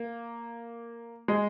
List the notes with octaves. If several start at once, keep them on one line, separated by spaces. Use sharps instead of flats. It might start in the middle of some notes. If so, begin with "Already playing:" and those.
Already playing: A#3
G#3